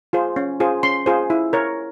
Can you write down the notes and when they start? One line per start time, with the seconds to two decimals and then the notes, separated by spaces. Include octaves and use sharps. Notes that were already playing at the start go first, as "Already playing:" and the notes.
0.13 F4 G#4 C5
0.36 C#4
0.60 F4 G#4 C5
0.83 C#4 C6
1.06 F4 G#4 C5
1.30 E4
1.53 A#4 C#5